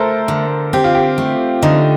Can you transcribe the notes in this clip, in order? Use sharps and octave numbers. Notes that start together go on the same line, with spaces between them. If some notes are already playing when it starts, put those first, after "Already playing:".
Already playing: A3 A4 A#4 C5
D3
C4 G4
F4
G4
A3
D3 D#4